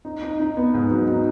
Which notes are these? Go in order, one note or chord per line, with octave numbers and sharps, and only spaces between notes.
D#4
D#4
D#4
B3
G#2
F#3
D#4